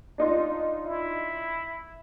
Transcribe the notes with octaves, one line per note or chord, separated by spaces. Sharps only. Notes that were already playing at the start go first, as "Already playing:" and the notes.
D4 D#4 F4
E4